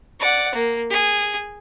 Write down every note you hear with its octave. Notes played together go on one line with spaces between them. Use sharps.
D5 F#5
A#3
G#4